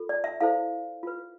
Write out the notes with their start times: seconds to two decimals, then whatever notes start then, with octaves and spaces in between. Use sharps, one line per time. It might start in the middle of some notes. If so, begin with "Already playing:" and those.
Already playing: F4 A4
0.09 D5
0.24 E5
0.41 E4 A4 C5 F5
1.03 F4 B4